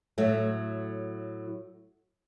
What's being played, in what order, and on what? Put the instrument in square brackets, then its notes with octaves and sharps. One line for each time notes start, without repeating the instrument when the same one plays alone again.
[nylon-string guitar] A2 F#3 A3